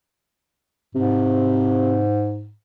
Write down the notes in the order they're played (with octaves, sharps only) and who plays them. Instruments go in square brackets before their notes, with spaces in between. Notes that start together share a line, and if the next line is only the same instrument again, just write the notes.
[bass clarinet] G#2 [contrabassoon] C3